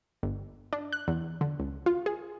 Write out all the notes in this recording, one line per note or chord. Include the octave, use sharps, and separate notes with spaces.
G1
D4
F#6
E2
D3
C#2
F4
G#4